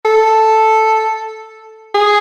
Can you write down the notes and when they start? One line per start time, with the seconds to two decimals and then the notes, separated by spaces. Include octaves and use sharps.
0.05 A4
1.95 G#4